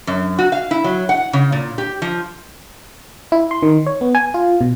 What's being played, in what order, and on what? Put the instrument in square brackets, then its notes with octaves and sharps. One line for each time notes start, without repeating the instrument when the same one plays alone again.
[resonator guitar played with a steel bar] F#2
F#4
F5
E4
F#3
F#5
C#3
A#2
G4
F3
[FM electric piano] E4
C6
D#3
C#5
B3
G#5
F4
B2